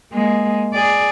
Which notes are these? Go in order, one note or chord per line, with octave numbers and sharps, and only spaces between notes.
G#3 A#3
G#4 D5